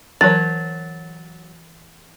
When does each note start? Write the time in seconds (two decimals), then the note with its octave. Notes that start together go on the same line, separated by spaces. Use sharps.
0.21 E3 F#3 A#4 C#5 A5 A6